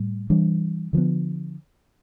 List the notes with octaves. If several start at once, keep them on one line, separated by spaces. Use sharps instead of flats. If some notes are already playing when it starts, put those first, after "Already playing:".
Already playing: A2 G3
E3 G3 D4
D3 F3 B3